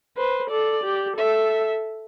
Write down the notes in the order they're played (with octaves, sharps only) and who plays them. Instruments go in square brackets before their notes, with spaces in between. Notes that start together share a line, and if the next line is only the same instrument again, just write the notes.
[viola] B4 [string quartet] C5
[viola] A4 [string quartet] D5
[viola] G4
[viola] A4 [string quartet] E5